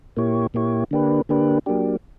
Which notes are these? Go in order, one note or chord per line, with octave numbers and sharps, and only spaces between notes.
A#2 A#3 E4 G4 C#5
A#2 A#3 E4 G4 C#5
D3 A#3 D4 G4 B4
D3 A#3 D4 G4 B4
F#3 A#3 D4 G4